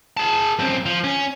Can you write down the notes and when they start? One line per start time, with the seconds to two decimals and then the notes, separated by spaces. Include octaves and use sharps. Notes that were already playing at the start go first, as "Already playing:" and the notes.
0.17 G#4 A5
0.59 F#2 C4
0.86 F3
1.04 C#4